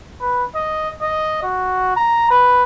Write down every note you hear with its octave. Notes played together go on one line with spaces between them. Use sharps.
B4
D#5
D#5
F#4
A#5
B4